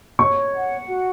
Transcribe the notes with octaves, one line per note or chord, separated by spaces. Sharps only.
C#5 C#6
F#5
F#4